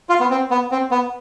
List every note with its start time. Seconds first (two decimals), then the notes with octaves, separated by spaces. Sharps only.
0.09 F4
0.20 B3
0.30 C4
0.51 B3
0.71 C4
0.91 B3